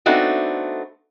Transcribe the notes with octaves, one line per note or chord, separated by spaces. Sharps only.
A3 B3 C4 D4 D#4 F#4